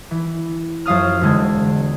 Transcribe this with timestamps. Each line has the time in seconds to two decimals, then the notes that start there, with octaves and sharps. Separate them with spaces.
0.11 E3
0.86 F#2 F3 F5 D#6 F6
1.21 E1 D3 G#3 G#6